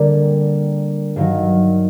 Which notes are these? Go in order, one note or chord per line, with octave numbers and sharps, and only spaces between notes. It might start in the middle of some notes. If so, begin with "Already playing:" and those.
Already playing: D3 G3 A#3 D4
G2 D#3 F#3